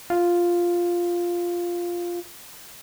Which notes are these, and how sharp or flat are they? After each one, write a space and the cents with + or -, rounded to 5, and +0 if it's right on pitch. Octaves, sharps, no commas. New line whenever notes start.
F4 +0